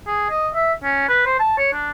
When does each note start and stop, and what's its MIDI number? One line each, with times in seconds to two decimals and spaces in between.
0.07 0.27 68
0.30 0.49 75
0.55 0.73 76
0.83 1.08 61
1.09 1.22 71
1.26 1.37 72
1.39 1.55 81
1.58 1.73 73
1.73 1.91 62